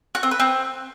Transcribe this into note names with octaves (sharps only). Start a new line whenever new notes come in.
F#4
C4
B4
C4